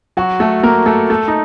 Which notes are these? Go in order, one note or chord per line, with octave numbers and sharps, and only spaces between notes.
F#3 F#4
A3 A4
A#3 A#4
A3 A4
A3 A4
D#4